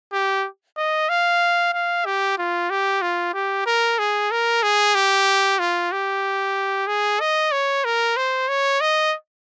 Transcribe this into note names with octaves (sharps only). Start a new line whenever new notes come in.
G4
D#5
F5
F5
G4
F4
G4
F4
G4
A#4
G#4
A#4
G#4
G4
F4
G4
G#4
D#5
C#5
A#4
C5
C#5
D#5